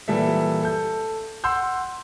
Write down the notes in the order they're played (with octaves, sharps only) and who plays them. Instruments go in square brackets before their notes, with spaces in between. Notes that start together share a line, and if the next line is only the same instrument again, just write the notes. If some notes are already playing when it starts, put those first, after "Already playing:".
[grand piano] A#2 E3 G3 A4 E5
A4 G6
F#5 C6 E6 G6